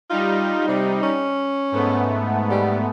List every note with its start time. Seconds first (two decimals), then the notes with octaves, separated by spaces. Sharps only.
0.10 G3 D#4 F4
0.68 C3
1.03 C#4
1.72 G#2 A3 B3
2.50 G3